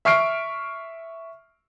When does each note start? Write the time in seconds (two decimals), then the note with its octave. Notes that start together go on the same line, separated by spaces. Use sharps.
0.05 E5 C#6 F6 C7 D7